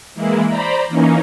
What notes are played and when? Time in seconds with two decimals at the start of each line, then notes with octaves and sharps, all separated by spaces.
0.15 E3 G#3 A#3 E4
0.47 C5 D5 A#5 B5
0.88 E3 A#3 C#4 D#4